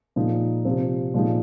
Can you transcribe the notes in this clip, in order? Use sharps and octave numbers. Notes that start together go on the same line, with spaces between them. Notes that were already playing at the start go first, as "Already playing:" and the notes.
A#2 F3 G#3 D#4
C3 F3 C4
A#2 F3 G#3 D#4